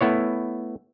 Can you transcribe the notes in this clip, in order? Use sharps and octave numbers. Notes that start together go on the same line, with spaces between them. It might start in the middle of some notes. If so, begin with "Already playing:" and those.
A3 B3 E4 C#5